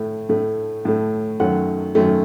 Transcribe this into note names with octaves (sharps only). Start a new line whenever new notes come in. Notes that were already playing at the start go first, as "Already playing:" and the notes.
Already playing: A2 A3
A2 A3
A2 A3
F#2 D#3 F#3 A3 F#5
F#2 D#3 F#3 A3